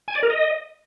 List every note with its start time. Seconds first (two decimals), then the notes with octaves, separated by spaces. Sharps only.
0.08 G#5
0.15 D5
0.23 A#4
0.30 D#5